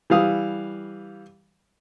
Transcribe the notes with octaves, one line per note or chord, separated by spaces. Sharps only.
E3 G3 F5 D#6